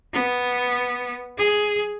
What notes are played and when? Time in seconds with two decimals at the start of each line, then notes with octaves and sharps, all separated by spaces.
0.13 B3
1.38 G#4